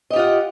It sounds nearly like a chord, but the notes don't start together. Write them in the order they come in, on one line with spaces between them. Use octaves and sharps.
D#5 G4 F4 F#5